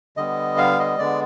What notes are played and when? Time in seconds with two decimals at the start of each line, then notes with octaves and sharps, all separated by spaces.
0.17 D3 G3 B3 D#5
0.58 F5
0.79 D#5
0.99 D3 G#3 B3 D5